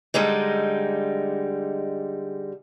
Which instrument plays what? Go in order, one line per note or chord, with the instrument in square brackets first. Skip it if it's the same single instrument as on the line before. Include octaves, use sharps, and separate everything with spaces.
[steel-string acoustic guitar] D3 G3 G#3 D#4